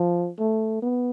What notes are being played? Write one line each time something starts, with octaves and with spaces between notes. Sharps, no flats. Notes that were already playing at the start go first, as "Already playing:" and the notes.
Already playing: F3
A3
B3